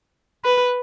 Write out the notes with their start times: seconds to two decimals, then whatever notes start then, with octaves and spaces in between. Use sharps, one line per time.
0.44 B4